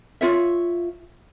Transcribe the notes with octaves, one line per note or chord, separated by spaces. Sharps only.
F4 C#5 E5